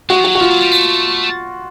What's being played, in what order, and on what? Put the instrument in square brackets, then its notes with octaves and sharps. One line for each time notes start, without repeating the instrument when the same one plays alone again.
[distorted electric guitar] G#3 [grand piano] F#4
[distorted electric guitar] F3
[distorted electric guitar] F#3 [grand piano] F#4
[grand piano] F#4
[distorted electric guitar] F3 [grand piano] F4
[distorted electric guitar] F#3
G3
A3